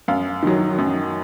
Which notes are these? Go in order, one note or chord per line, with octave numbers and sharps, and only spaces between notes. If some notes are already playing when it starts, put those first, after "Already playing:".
F#2 F5
D#3 F#3
F#2